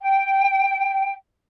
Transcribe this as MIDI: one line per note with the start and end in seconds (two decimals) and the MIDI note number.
0.01 1.11 79